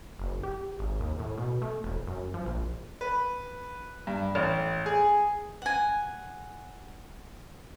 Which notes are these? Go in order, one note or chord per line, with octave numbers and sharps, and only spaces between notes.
F#1
G4
G#1
D#2
A2
B2
A3
E1
F#2
F3
A#1
B4
G2
A1
G#4
F#5 G#5